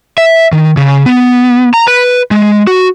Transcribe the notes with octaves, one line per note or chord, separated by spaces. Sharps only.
E5
D#3
C#3
B3
A#5
B4
G#3
F#4